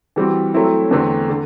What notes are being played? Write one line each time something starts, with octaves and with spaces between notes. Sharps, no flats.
E3 G3 C4 F#4
F#3 A3 C4 E4
E2 D3 A3 C4
D3